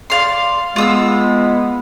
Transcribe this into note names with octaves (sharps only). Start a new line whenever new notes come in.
D5 F5 C6
G#3 B3 F4 D#6 E6